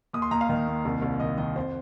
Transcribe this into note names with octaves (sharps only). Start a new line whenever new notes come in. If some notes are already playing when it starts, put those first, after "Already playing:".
D#2 D#6
C6
D#2 A#5
F5
D#3
D#2
C2
C2
D#3 D#5
D#3 D#5
F2 C5